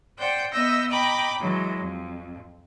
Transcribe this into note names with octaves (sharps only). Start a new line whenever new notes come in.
C5 D5 F#5 G5 G6
B3 D#5 E5 E6 G6 A#6
D#5 G5 A#5 B5 D6
E3 F#3 G#3
F2